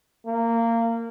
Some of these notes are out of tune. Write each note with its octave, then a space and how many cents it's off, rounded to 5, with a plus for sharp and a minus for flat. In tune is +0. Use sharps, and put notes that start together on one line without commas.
A#3 -20